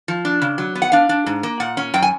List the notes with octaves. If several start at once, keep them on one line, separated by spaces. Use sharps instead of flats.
F3
D4
C#3
F#3
B3
F#5
D4 F5
D4
G#2
A#3
A#2 F#5
C#4
F#2 G5
G#5